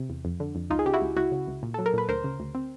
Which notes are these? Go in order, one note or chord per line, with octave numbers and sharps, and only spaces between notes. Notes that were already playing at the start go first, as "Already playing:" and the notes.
Already playing: C3
E2
F2
D3
F2
C#2 D#4 F4
G#4
C#3 G4
E4 F#4
C#2
C#2 E4 F#4
C#3
C#2
A#2
F#3 A4
A#4
A#2 B4
D2 A#4 C5
C#3
D2
C4